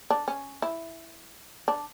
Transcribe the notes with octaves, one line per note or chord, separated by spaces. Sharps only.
D4
C#4
E4
D4